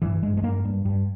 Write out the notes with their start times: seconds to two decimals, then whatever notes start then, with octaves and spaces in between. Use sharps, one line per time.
0.02 G2 E3
0.23 G2 G#3
0.37 G#3
0.43 G2 A#3
0.65 G2
0.85 G2